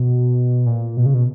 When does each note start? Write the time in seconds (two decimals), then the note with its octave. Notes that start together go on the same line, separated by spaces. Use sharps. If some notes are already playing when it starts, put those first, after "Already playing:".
Already playing: B2
0.66 A#2
0.97 B2
1.06 C#3
1.14 B2